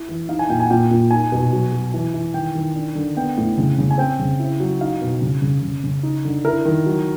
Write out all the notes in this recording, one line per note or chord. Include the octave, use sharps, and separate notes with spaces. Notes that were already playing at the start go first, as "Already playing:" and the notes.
Already playing: E4 E5
E3
D#4 F5
G#5
A#2 G5
G#5
F#5
A#2 G5
A#2
D#4 G#5
B2
F#3
F#3
E3
E3
D#3 G5
D#3
D4
D3
B3 G5
A2
C#3
C#3
G#5
C4 G5
C#3
E4
F#3
D#4 F5
B2
C#3
C#3
C#3
C#3
D#4
D3
E4 A#4
D#3
F#3